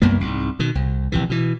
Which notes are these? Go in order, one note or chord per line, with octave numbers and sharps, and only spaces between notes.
C2 F#2 A#3 B3
C2 G#2
B2 D#3
C2
A#1 C3 E3
B2 E3